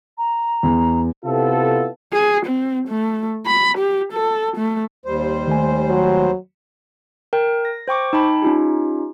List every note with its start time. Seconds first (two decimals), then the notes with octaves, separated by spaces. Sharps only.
0.18 A#5
0.63 E2
1.25 C3 B3 E4 F4 A4
2.13 G#4
2.46 C4
2.88 A3
3.46 B5
3.77 G4
4.12 A4
4.57 A3
5.06 D#2 G3 C5
5.47 D#3 A3 G#5
5.90 F#3
7.33 A#4 G5
7.65 A#6
7.88 C5 G5 C#6 D6
8.13 D#4 G5 A5 B5
8.42 C#4 D#4 F4 G4